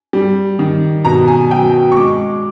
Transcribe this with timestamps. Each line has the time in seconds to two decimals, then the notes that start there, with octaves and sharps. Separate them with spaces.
0.13 G3
0.59 D#3
1.05 B2 A#5
1.28 G#5
1.51 F#3 G5
1.92 C#6
1.97 G#3 D6